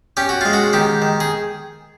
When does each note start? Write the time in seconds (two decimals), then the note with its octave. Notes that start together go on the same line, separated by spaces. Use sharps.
0.17 C#4 G4
0.29 F#4
0.41 G#3 F4
0.53 F#4
0.73 D#3 G4
1.02 D#3
1.20 G#4